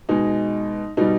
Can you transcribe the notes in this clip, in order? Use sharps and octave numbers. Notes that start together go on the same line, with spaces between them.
B2 G#3 D#4
B2 G3 D#4